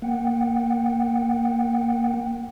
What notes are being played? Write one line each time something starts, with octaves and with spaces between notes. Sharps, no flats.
A#3 F#5 G5